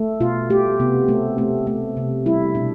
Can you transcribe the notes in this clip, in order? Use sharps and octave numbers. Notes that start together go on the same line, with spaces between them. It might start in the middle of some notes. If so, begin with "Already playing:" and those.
Already playing: A3
B2 F4
A3 G4
C3 B3
A3 C4
A3 C4
A3
C3
G3 E4
B2 D4